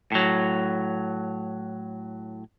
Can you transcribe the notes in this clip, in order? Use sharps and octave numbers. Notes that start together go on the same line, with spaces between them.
A2 F#3